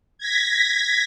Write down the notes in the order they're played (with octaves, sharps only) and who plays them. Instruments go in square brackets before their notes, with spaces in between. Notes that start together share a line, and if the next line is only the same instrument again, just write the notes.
[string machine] G#6 A#6 B6